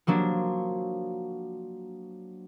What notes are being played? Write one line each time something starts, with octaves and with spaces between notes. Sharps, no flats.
F3 F#3 A#3 D4